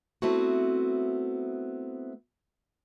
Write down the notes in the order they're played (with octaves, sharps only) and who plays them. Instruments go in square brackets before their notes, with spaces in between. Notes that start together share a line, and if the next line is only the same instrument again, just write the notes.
[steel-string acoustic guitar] A3 B3 C4 E4 F#4